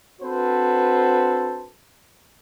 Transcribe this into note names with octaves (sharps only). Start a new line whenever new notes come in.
C4 D4 F#4 A4 B4 C5